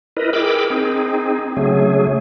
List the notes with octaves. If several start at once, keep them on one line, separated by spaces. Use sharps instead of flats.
E4 A#4 B4 D#5
G#4 A#4 G5 B5 D6 E6
C4 D#4 G#4
C#3 F#3 A3 G#4